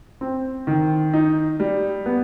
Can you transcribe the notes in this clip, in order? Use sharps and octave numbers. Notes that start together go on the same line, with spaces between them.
C4
D#3
D#4
G3
B3